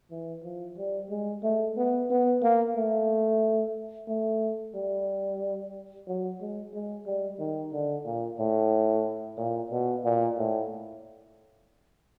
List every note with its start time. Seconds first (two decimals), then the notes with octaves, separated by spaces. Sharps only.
0.11 E3
0.44 F3
0.78 G3
1.11 G#3
1.43 A3
1.77 B3
2.10 B3
2.43 A#3
2.76 A3
4.08 A3
4.75 G3
6.07 F#3
6.41 G#3
6.74 G#3
7.06 G3
7.39 D#3
7.73 D3
8.05 A#2
8.39 A2
9.38 A#2
9.72 B2
10.05 A#2
10.38 A2